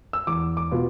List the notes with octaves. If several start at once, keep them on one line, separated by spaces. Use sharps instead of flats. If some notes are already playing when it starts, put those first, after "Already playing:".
E6
E2 D6
D6
B2 B3 F4